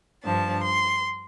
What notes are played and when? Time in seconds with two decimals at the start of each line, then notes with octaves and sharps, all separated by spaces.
0.24 G2 F3 D4 A5
0.63 C6